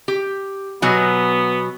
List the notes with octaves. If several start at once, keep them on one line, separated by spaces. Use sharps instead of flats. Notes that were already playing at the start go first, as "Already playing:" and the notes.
G4
B2 F#3 B3 G#5